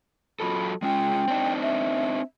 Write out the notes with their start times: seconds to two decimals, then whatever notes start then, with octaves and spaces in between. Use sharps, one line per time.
0.40 F#3 F4 A4 B5
0.82 G#3 C#4 F4 G5
1.28 C4 D4 D#4
1.62 E5